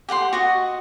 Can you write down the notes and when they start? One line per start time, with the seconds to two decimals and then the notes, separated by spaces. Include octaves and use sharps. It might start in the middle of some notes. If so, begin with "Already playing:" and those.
0.09 G4 F#5 G5 C6
0.33 F#4 D#5 F#5